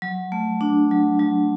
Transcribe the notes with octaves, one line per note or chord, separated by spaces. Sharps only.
F#3
A3
D4
F#3
F#3